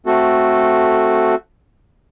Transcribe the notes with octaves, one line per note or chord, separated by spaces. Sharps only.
A3 C4 F#4 A4